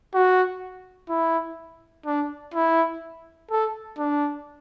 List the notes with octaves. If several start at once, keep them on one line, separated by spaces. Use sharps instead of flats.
F#4
E4
D4
E4
A4
D4